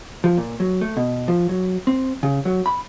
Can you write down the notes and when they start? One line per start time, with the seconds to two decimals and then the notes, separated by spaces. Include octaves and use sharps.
0.24 F3
0.37 A#2
0.60 F#3
0.81 A3
0.97 B2
1.28 F3
1.49 F#3
1.87 C4
2.23 C#3
2.45 F#3
2.66 B5